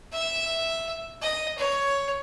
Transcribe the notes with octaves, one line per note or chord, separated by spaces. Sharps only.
E5
D#5
C#5